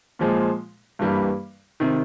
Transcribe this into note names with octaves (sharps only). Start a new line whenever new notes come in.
A#2 F3 G#3
G2 E3 G3 A#3
C3 D#3